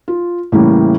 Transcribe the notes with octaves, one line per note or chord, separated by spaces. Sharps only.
F4
A2 C#3 E3 G3 A#3